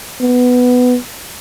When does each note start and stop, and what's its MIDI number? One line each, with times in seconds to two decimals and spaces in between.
0.21 0.97 59